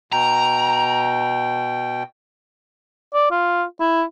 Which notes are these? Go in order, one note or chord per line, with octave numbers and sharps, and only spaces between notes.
B2 G5 A#5
D5
F4
E4